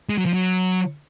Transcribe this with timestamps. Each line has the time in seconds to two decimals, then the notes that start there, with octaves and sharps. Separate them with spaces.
0.09 G#3
0.18 F#3
0.26 F3
0.34 F#3